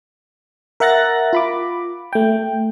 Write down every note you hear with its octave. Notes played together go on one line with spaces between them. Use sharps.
A#4 E5 F#5 F#6 A6 A#6
F4 B5 D6
A3 G5